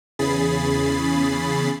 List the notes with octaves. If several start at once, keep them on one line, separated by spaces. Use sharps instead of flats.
E2 C#3 G#4 B5 A6 C7